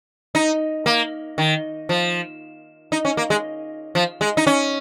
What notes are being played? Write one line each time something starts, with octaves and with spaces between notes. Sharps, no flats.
D#4
A#3
D#3
F3
D#4
C#4
A#3
G#3
F3
G#3
D#4
C#4